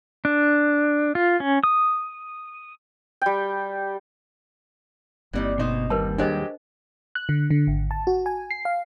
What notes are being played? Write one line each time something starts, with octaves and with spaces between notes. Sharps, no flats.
D4
F4
C#4
D#6
G3 G5
G1 E3 G3 A#3 C4 D#4
B2 D#4 C5
D#2 G3 A#4 B4 A5
F#3 G#3 D4 G4 C5 D#5
F#6
D3
D3
G#1
A5
F#4
G#5
C7
F5